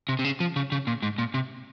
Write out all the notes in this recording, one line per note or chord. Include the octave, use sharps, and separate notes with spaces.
C3
C3
C#3
F3
C#3
C#3
A#2
G#2
A#2
C3